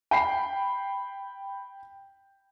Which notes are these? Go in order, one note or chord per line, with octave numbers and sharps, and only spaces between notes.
G5 B5 C7